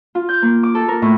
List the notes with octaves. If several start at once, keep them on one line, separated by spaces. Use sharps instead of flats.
F4
G6
A#3
D6
A4
A#4
A2